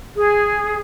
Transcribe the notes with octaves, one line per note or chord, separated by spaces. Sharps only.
G#4